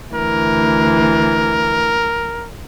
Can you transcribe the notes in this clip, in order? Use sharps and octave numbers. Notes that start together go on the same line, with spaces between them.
D2 E3 A#4